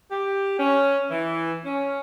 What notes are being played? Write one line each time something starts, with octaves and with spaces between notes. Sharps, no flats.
G4
C#4
E3
C#4